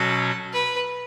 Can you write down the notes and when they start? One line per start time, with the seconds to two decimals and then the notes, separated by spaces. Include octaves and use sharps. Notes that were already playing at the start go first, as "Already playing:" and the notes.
Already playing: B2 F#3 C#4 F#4 A4
0.53 B4